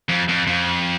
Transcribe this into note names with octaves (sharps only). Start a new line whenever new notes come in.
F2
F2
F2